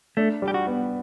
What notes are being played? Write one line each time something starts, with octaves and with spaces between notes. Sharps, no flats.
A3 D4
G3
G4
F#4
B3